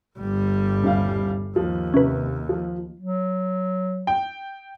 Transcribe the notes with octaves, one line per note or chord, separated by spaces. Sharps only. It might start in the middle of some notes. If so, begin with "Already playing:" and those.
G1 G3
D#1 E4 F5
D#2 F3
C3 C#4 B4
F3
F#3
G5